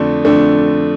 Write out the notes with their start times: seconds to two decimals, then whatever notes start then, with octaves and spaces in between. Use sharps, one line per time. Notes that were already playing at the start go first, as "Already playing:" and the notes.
Already playing: F2 D3 A3 D4
0.25 F2 D3 A3 D4